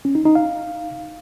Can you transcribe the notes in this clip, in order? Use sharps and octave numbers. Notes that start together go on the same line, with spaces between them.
C#4
D#4
D#4
F5